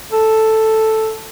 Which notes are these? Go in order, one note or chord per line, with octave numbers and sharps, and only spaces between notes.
A4